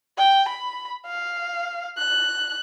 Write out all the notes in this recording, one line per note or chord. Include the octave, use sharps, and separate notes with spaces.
G5
B5
F5
F#6